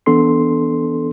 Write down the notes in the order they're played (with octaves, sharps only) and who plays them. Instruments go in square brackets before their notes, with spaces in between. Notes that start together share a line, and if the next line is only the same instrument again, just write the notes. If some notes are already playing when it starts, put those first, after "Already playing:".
[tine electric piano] E3 B3 D4 A4 C6 C7